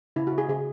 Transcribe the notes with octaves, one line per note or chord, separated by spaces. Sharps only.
C#3 E4
F#4
C#3
G#4
C#3 G#4